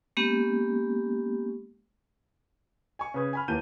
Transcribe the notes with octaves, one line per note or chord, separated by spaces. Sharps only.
G#3 A#3 B3 C#4 G4
G#5 C#6
C#3 B4 D#6 G#6
G#5 B5 F6
D#2 E3 A#3 A5 G6 D#7